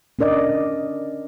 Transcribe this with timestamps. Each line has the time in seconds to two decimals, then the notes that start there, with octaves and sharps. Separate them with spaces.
0.19 C#4 D4 A#4 D5 D#5